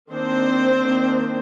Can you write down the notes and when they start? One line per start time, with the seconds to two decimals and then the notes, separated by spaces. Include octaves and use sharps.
0.11 D#3 A#3 C4 D4 C5
0.81 D#3 A#3 D4